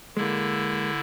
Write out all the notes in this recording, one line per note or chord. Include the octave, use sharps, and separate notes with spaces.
D3 G#3 A#3 E4